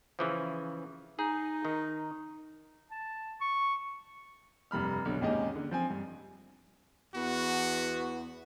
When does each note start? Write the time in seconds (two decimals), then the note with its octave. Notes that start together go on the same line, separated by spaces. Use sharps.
0.19 C#3 E3 F3
1.19 D#4 G#4
1.65 D#3
2.91 A5
3.41 C#6
4.71 F1 G2 B5 F6
5.05 B1 D3
5.21 G#1 D#2 G#3 C#4 G4 D#5
5.56 D3
5.71 F3 C4 G#5
5.90 G2
7.15 E2 B3 F#4